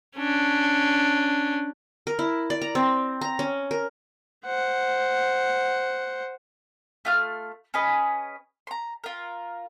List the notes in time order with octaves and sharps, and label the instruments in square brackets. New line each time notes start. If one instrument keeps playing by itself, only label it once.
[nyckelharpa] C#4 D4
[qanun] A#4
E4
D5
A#5
C4
A#5
C#4
A#4
[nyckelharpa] C5 F#5
[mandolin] A3 F4 F6
C#4 G#4 B4 D#5
A#5 C6
F4 A#4